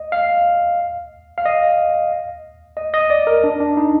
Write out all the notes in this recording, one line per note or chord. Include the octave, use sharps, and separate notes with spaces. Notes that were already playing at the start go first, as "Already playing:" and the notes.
Already playing: D#5
F5
F5
D#5
D#5
D#5
D5
A#4
D4
D4
D#4